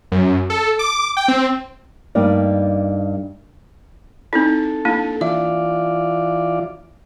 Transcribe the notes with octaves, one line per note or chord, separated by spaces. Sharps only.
F#2
A4
D6
G5
C4
G2 A#3 D#4 D5
C4 D#4 E4 A4
A#3 D4 E4
E3 F4 D5 E5